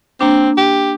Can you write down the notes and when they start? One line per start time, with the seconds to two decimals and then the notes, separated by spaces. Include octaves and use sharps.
0.21 A#3 C4 D4
0.57 G4